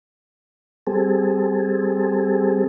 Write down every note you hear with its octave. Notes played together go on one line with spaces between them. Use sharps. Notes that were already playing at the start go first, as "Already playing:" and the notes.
G3 C4 G#4 A4